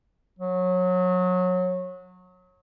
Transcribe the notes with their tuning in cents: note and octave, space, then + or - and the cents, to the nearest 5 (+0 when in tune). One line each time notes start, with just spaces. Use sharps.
F#3 -25